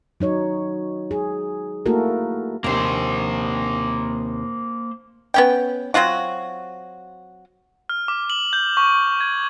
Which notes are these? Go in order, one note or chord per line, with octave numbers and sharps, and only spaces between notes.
F#3 D#4 C#5
G#4
A3 A#3 E4 F#4 A4 A#4
D#2 C3 A#3 C5
B3 C#4 G5
F#3 C4 F4 F#4
F6
D6
F#7
G6
C#6
G#6